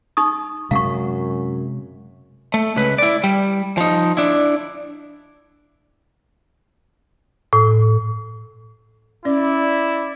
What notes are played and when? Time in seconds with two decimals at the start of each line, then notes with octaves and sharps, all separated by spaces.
0.17 D#4 C#6 D#6
0.71 F#2 C3 G#3 C#4 F5 F#5 C#6
2.54 A3
2.77 C#2 B4
2.98 E4 D5
3.24 G3
3.78 F3 D#4
4.17 D4 E4
7.53 A2
9.25 C#4 E4 D5